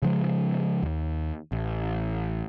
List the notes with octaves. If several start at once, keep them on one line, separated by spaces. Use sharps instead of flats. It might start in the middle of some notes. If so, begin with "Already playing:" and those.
C#3 F3 G#3
D#2
A1